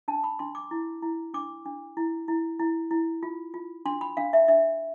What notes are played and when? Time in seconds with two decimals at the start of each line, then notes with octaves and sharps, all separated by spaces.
0.08 D4 A5
0.24 B5
0.39 D4 C6
0.55 D6
0.71 E4
1.02 E4
1.34 D4 D6
1.65 D4
1.97 E4
2.28 E4
2.59 E4
2.91 E4
3.23 F4
3.54 F4
3.86 D4 C6
4.01 B5
4.17 D4 F5
4.33 E5
4.48 D4 E5